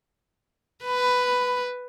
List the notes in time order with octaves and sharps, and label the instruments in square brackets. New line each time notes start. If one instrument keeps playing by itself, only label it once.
[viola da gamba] B4 [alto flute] B5